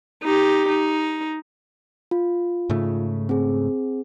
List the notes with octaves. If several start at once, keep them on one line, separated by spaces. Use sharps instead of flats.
D#4 G4
D#4
F4
G#2 C#3 A3
C4 G#4